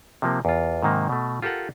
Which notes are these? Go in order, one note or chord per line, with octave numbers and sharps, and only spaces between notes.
C3 F3 A#3
E2 F4
G#2 C3 D#3 A#3
B2 A3
F4 G4 A4 A#4 F#5